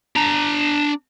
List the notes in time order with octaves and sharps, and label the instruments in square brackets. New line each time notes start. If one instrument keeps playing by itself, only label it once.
[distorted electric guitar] D4 A#5